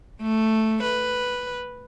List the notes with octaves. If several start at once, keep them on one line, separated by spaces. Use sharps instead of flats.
A3
B4